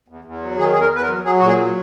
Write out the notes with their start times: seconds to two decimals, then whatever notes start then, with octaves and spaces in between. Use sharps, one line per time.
0.08 E2
0.25 E2
0.42 F#3
0.58 D#3 G#4
0.72 E2 G#4
0.80 A#4
0.91 E2 B4
1.02 A#4
1.08 F#3
1.24 F#3 G#4
1.39 A#2 F#4
1.47 G#4
1.58 F#3